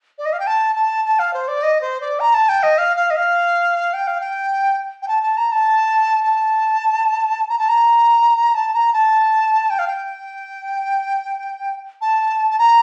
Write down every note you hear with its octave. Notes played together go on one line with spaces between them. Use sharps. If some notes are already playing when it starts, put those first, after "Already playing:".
D5
D#5
F5
G5
A5
A5
A5
F5
C5
D5
D#5
C5
D5
A#5
A5
G5
D#5
F5
F5
D#5
F5
G5
F5
G5
G5
A5
A5
A#5
A5
A5
A#5
A5
A#5
A5
A#5
A5
G5
F5
G5
A5
A5
A#5